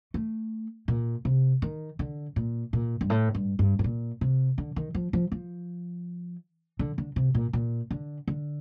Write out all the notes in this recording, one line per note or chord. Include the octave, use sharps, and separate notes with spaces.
A3
A#2
C3
D#3
D3
A#2
A#2
G2
A2
G2
G2
A2
A#2
C3
D3
D#3
F3
F3
F3
D3
D3
C3
A#2
A#2
D3
D3